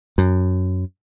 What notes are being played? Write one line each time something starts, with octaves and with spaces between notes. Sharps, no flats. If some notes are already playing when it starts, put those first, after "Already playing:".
F#2